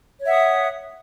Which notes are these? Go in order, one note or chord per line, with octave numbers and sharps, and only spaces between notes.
C#5 E5 F#5 D#6